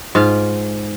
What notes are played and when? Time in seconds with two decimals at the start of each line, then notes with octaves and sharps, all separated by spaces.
0.15 G#2 F4 F5